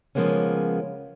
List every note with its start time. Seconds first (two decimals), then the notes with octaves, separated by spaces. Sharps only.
0.15 C#3 F3 G#3 A#3 B3 C#4